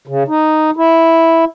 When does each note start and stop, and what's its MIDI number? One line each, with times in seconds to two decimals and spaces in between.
0.08 0.23 49
0.28 0.71 63
0.77 1.45 64